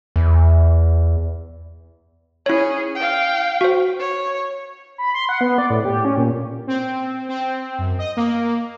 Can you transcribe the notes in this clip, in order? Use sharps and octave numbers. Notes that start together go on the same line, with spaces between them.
E2
C#4 E4 G#4 C#5
F5 G5
F#4 C5
C#5
B5
C6
F#5
B3
D5
A2
G4
C#4
A#2
C4
C4
F#2
D#5
A#3